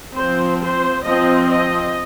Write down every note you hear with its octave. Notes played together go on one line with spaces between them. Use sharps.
F3 C4 C5
C5
F3 C4 D#5
D#5